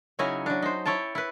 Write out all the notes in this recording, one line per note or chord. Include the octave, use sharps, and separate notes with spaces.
C#3 F#3 D#4 E4 C#5 G#5
F#3 D4
D#4 C5
E4 C#5 G5 A5
E4 B4